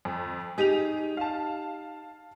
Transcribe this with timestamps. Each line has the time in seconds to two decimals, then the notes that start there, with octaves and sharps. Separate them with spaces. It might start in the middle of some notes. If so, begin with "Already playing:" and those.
0.05 F2
0.58 D#4 G4 G#4 D#7 F7
1.17 F5 A5